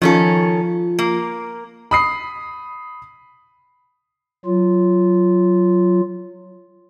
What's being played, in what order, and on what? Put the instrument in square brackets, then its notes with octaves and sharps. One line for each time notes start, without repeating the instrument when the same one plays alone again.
[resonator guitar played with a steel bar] D#3 C#4 A4 [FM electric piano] F3 F4
[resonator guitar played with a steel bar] A#3
[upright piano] B5 D#6 C7
[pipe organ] F#3 F4